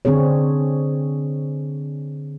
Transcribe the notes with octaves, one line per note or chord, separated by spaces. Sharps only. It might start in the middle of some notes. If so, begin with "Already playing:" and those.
D3 C4 D4 G#4 C#5